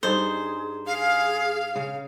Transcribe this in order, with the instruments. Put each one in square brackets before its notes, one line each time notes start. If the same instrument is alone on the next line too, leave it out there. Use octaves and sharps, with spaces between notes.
[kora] G2 D#4 A4 [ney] G#4 [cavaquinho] C5
[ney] G#4 [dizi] F5
[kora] C#3